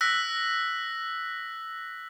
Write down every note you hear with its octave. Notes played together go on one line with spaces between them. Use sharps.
E6 F#6 A#6 B6